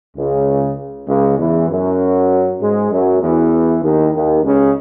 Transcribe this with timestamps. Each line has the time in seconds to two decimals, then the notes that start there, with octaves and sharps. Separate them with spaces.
0.17 C#2 C#3
1.08 C#2 C#3
1.38 E2 E3
1.69 F#2 F#3
2.60 G#2 G#3
2.91 F#2 F#3
3.21 E2 E3
3.82 D#2 D#3
4.14 D#2 D#3
4.44 C#2 C#3